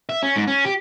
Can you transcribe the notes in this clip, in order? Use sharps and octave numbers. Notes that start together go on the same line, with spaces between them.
E5
C#4
G#2
C#4
G4